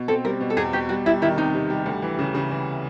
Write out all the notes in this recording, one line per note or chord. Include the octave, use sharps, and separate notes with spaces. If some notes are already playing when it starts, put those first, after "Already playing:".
Already playing: B2
C4 A4
G3 A#4
B2
A4
E2 G#4
B2 G4
G3 F#4
G3 E4
D#3 E4
C3 D#4
C3
G3
D2
E3
C#3
C#3
E3